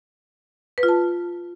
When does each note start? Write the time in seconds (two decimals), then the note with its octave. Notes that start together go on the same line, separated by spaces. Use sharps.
0.78 B4
0.83 F4
0.88 A5